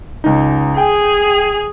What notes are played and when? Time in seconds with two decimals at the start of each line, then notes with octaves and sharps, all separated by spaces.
0.24 C#2 D#4
0.77 G#4 G5 G#5